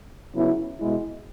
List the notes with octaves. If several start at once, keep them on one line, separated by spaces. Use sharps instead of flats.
C#3 F#3 B3 E4
B2 G#3 E4